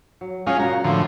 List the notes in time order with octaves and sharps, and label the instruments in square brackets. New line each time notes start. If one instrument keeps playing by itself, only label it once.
[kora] F#3
[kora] A#2 C#5 [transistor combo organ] G#3 C#4 F5
[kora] C#3 F#4 G5 [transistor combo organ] A#5
[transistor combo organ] A2 D3 F3 [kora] G#3 C5 E5